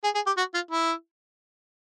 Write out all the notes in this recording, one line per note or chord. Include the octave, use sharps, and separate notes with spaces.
G#4
G#4
G4
F#4
F4
E4